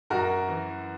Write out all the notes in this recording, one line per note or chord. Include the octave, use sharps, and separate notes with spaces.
F#2 F#4 A#4
E3